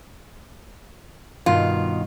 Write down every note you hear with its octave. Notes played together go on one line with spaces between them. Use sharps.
G2 B2 D#3 F4